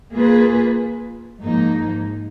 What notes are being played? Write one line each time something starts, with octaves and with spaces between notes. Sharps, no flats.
A#3 F4 G#4 B4
G#2 F3 A#3 D#4